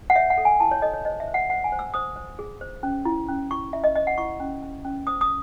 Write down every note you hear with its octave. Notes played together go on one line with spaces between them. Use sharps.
F#5
C#5 E5
F#5
A4
G#5
E4 A5
C#5
A4 D#5
C#5
C5 D#5
E5
C5
F#5
C5 F#5
G#5
C5
E6
C5 D#6
C5
G#4
C5
C#4
E4
C#4
E4 C#6
E4 E5
D#5
C5 D#5
F#5
E4 C#6
C#4
C#4
C#4
C5 D#6
D#6